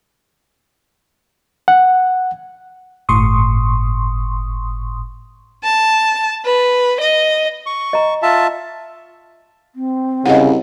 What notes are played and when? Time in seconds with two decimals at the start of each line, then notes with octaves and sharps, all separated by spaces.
1.68 F#5
3.09 G1 A2 C6 C#6 D#6
5.64 A5
6.45 B4
7.00 D#5
7.66 C#6
7.93 D#5 A#5
8.23 F4 E5 A5
9.75 C4
10.26 C2 C#3 D#5 F#5